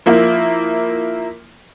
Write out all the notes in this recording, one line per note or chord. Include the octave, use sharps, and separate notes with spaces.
F3 A#3 E4